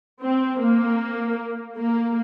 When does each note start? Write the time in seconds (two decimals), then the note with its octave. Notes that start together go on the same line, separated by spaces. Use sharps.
0.22 C4
0.60 A#3
1.78 A#3